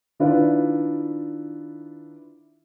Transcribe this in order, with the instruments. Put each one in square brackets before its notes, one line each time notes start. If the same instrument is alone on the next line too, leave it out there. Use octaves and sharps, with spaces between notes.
[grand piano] D#3 D4 E4 F4 B4 D5